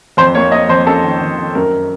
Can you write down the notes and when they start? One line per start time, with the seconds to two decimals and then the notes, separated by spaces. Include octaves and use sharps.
0.17 F2 C5
0.35 A#3 C#5
0.52 A#3 D#5
0.69 F2 C5
0.87 C#4 A4
1.04 D#3
1.21 D#3
1.38 D#3
1.55 F#2 A#4